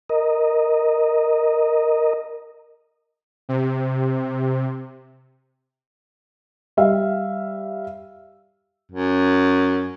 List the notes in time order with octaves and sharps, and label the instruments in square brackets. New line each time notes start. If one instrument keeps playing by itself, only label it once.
[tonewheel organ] A#4 D#5
[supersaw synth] C3
[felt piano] G3 E5 F5
[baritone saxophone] F#2